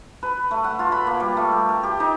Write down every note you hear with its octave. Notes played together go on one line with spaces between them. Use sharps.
B4
A3
F#5
F4
B5
A#3
G3
A3
G5
A#4
G4
D#4